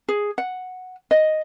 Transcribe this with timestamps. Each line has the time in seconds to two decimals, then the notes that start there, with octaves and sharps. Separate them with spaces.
0.09 G#4
0.38 F#5
1.11 D#5